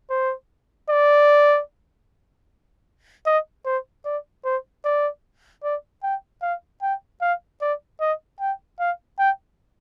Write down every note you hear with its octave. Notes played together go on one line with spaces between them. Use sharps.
C5
D5
D#5
C5
D5
C5
D5
D5
G5
F5
G5
F5
D5
D#5
G5
F5
G5